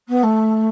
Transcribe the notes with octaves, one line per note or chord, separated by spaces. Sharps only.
B3
A3